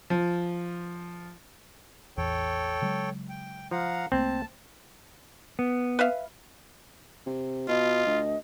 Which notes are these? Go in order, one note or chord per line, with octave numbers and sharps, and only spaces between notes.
F3
A1 E2 E3 A4 C#5 G5
C#3 F#3 G#3
G5
F3 F5 F#5 A#5
C2 A3 A#3 C4 A5
B3
B4 E5 F5
C3
B2 F4 D#5
D2